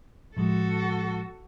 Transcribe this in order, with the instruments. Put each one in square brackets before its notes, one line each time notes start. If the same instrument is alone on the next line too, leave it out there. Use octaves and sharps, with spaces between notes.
[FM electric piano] A2 F3 G#3 [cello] F#4 A4